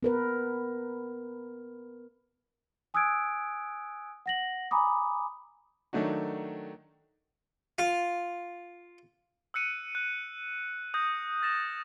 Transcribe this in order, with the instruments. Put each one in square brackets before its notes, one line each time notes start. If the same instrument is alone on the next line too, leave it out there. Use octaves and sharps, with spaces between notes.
[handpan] B3 A#4 B4
[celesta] G#5 D#6 E6 F#6 G#6 D7
F#5 A#6 F#7
G#5 A#5 B5 D6 D#6
[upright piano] D#3 F#3 A3 D4 D#4 F#4
[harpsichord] F4
[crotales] E6 F#6 C#7 D#7
F#6
D#6 G6 A#6
F6 A6 A#6 E7